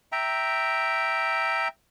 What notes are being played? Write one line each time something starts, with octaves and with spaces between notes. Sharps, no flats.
E5 G5 A#5